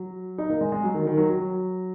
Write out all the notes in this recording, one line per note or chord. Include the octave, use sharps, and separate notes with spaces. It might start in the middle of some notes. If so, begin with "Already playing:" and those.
Already playing: F#3
D#4
A#3
G#3
G#3
F#3
D#3
D#3
F#3
F#3